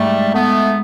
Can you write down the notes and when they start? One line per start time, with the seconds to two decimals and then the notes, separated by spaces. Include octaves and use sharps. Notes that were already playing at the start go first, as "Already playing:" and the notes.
Already playing: G#2 G3 A3
0.34 A3 B3